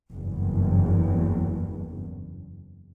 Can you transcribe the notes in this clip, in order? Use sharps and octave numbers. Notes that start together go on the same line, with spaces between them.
F#1 E2 G2